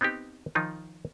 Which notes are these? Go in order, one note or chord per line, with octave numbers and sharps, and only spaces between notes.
B3 C4 D#4 G4
D#3 F3 D#4 F4